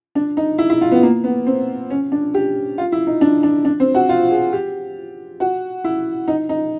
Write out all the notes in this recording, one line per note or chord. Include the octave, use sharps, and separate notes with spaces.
D4
D#4
E4
E4
F4
B3
A#3
B3
C4
C#4
D4
G4
F4
E4
D#4
D4
D4
D4
C4
F#4
F4
G#4
G4
F#4
E4
D#4
D#4